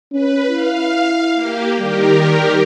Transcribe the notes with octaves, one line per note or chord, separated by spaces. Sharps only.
C#4 B4
E4 F5
A#3 G4
D#3 G3 G4 A#4